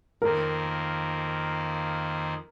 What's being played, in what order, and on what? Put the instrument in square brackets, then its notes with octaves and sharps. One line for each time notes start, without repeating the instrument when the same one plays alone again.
[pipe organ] F2 D#3 A#3 [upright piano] A#4